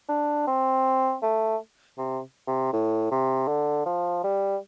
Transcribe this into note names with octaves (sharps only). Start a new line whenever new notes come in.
D4
C4
A3
C3
C3
A2
C3
D3
F3
G3